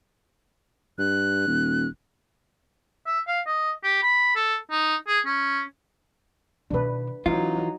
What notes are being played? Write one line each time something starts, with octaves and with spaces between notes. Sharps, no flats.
G2 F#6
D#1
E5
F5
D#5
G4
B5
A4
D#4
G#4
C#4
B2 D#3 D4 B4
E3 F#3 C#4 D#4 F4